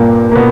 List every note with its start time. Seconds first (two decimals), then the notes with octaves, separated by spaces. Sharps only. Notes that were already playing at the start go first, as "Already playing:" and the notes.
Already playing: G2 A#2 A#3
0.31 A#3
0.35 B2 B3